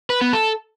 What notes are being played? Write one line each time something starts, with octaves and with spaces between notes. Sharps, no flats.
B4
B3
A4